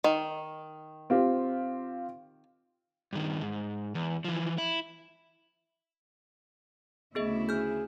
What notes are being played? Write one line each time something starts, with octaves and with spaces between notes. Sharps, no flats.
D#3
C4 F4 G4
G2 D#3
G#2
E2
E3 F3
E4
D2 C#3 B3 E4 G#4 D#5
G#4 F6 G6